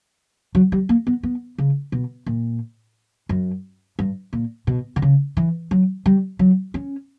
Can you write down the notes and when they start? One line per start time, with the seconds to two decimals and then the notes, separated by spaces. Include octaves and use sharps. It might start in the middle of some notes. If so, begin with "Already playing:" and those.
0.55 F#3
0.72 G3
0.89 A#3
1.07 B3
1.23 B3
1.58 C#3
1.92 B2
2.26 A#2
3.29 F#2
3.99 G2
4.33 A#2
4.67 B2
4.96 D3
5.02 C#3
5.37 E3
5.71 F#3
6.06 G3
6.39 F#3
6.74 C#4